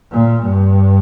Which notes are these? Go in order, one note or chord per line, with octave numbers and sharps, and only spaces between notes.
A#2
G2